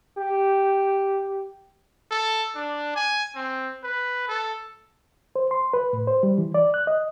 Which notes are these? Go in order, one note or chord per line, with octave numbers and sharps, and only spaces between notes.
G4
A4
D4
G#5
C4
B4
A4
C5
C6
B4
A2
C5
G3
E3
D5
F#6
D#5